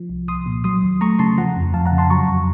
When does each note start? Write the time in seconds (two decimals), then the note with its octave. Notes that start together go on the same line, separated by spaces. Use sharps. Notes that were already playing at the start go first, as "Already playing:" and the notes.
Already playing: F3
0.09 C2
0.28 C2 C6 D#6
0.46 A#2
0.64 F#3 C6 D#6
0.83 D#2
1.01 A3 A#5 C#6
1.19 C#3 A5 C6
1.38 F3 F#5 A#5
1.56 F2
1.74 F2 F5 A5
1.86 F#5 A#5
1.92 C#3
1.98 A5 C6
2.10 F#3 A#5 C#6
2.28 F2